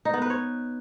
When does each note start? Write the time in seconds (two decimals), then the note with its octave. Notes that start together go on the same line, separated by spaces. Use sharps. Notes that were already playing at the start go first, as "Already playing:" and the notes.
0.05 D#4
0.14 B3
0.22 B4
0.30 C#5